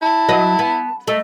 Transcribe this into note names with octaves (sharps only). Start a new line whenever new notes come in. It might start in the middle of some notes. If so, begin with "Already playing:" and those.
E4 A5
F#3 B4 D#5
B3
A3 D#5